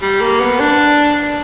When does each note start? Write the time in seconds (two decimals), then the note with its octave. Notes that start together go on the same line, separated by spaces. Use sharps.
0.02 G3
0.21 A#3
0.40 B3
0.60 D4